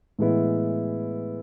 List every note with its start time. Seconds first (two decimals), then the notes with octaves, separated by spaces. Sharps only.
0.19 A2 E3 G#3 B3 E4